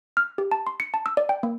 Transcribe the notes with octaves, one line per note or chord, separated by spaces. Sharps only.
F6
G4
A5
C6
C#7
A5
E6
D5
G5
A#3